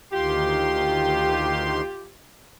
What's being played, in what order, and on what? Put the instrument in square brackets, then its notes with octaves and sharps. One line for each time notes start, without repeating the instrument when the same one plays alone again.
[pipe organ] D2 D#3 C6 [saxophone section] F4 G4